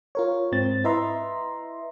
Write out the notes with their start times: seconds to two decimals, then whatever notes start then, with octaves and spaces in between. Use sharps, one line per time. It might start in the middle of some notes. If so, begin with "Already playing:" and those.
0.15 F4 A#4 C#5
0.52 G#2 C4 A6
0.84 E4 B4 D#5 E5 A#5 C6